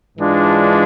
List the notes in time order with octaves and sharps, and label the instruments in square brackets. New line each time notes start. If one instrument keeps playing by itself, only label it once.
[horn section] G#2 E3 G#3 D4 F4